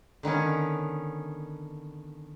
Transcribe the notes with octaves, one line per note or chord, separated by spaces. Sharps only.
D3 D#3 B3 C#4